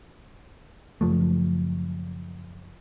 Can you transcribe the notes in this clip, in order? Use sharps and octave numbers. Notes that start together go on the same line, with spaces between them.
F#1 F3 A3